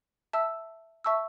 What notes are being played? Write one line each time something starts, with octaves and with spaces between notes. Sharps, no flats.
E5 A5 E6
E5 A5 C#6 E6